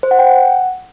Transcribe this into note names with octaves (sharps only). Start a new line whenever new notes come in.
C5
F#5
G5
F#5